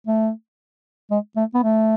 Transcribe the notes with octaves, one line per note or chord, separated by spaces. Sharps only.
A3
G#3
A3
B3
A3